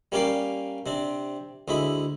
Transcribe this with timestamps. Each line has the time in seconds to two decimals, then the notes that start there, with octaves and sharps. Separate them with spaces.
0.12 G3 A#3 C#4 G4 D5 F5
0.86 C3 C4 D4
1.68 D2 G#3 E4 B5